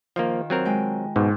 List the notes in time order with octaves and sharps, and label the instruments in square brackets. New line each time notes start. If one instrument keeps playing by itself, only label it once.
[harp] D#3 F4 [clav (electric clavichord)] F3 A#3
[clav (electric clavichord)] F#3 C4 A#4
[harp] G#3 G5
[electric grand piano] G#2 [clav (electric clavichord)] B2